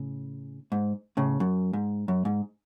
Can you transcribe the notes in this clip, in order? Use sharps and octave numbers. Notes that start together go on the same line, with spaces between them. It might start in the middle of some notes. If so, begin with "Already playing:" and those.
Already playing: A2 C#3
G#2
A2 C#3
F#2
G#2
F#2
G#2